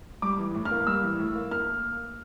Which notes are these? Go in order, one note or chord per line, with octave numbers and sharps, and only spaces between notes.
G3 D6
E3
A2
F6
A#3
G3 E6
E3
A2
A#3
A#3 F6